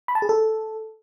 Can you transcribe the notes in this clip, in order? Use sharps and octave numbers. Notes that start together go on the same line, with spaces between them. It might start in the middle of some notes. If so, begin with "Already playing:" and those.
B5
A5
G#4
A4